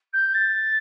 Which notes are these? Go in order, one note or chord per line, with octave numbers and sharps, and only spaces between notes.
G6
A6